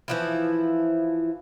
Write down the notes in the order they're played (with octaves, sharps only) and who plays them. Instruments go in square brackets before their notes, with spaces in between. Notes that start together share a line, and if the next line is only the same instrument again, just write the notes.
[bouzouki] E3 F3 E4